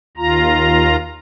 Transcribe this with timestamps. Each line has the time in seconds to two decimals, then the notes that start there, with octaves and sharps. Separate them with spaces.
0.17 D#2 F4 A#5